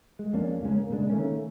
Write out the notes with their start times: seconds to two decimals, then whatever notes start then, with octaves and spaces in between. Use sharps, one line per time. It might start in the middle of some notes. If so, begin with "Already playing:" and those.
0.19 G#3
0.33 F2 A#3 C#4 D4
0.63 C#2 G#2 G#3 C#4
0.75 A#3
0.90 A#2 C#3 G#3 D4
1.10 D#3 A3 A#3 C#4